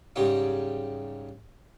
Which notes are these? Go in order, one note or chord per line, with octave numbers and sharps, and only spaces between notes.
G#2 C#3 G3 D#4 G4